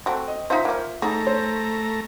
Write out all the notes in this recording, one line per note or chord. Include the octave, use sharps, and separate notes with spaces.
A3 C4 F#4
D#5
D#4 F4 C5 E5 B6
F3 A#3
A3 D#4 G#4 A#5
C5